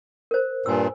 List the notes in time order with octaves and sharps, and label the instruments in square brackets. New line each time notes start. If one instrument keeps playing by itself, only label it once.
[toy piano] A#4 C5
[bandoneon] G2 A#2 [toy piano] G#5 E6